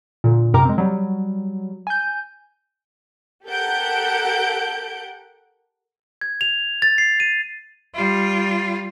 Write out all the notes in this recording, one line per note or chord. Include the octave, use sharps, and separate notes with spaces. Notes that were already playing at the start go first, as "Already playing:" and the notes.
A#2 D3
F#2 C3 A#4 G5 A#5 D6
G#3 C4
F#3 G3
G#5 G6
G4 A4 A#4 F#5 G6 D7
G#6
F7
A6
C7
D#7
G3 F4